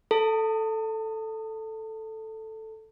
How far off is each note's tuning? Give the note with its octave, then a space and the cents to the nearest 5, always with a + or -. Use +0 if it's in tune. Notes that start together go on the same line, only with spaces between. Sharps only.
A4 +0 A5 +35